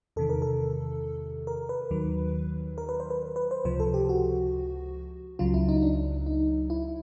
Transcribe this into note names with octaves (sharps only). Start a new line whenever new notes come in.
E2 C3 D#3 A4
A#4
A4
A#4
B4
D#2 D#3 F#3
A#4
B4
C5
B4
B4
C5
C#2 C3 F3 C5
A4
G4
F#4
C#2 C#3 F#3 F4
E4
D#4
D4
D#4
E4